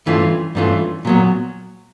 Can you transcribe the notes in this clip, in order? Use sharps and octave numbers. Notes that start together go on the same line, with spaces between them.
G2 E3 A3 C#4 F4
G2 E3 A3 C#4 F4
A#2 F#3 B3